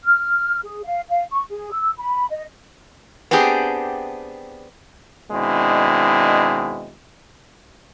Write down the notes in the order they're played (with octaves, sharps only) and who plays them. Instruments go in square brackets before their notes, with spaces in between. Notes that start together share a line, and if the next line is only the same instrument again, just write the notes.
[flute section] F6
G#4
F5
F5
C#6
G#4
E6
B5
D#5
[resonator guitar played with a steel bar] B3 C4 D4 G4 G#4
[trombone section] B2 D#3 G#3 C4 D4 E4